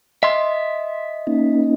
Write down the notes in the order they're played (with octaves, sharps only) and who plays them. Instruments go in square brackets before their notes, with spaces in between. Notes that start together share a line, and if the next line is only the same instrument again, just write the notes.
[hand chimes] D#5 [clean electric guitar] E5 C6
[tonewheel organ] A#3 C#4 D#4